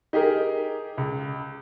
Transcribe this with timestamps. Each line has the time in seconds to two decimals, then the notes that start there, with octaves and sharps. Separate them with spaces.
0.13 D#4 G4 G#4 A#4
0.98 C#2